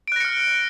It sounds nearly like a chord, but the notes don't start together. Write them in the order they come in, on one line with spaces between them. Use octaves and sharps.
D7 F#6 A#6 C#7 F6